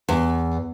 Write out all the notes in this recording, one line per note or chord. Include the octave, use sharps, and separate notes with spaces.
E2